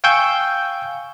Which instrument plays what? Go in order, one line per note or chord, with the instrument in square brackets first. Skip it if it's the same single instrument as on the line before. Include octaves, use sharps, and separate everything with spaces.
[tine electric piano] F5 G5 G#5 C#6 E6 G6